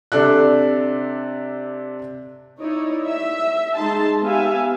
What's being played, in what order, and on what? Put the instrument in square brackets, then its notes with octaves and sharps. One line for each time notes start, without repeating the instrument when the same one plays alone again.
[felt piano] C3 D4 A4 D5 F#6
[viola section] D#4 E4 C#5 D5
E5
G#3 D#4 A5 C6
B3 G4 E5 F5 G#5